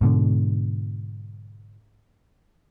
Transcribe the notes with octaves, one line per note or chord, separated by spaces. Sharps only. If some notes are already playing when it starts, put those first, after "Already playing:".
G#2 B2 D3